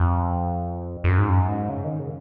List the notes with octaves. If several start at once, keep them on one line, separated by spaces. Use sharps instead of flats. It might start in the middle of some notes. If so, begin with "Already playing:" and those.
Already playing: F2
F2
F#2
G#2
F#2
G#2
C#3
D#3
C#3